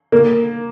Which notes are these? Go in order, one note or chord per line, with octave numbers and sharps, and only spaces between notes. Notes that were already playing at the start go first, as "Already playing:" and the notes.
A#3